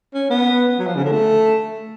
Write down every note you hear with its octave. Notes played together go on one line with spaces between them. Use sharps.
C#4
B3
F#3
F3
C#3
D3
A3